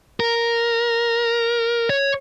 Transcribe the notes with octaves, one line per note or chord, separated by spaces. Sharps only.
A#4
C#5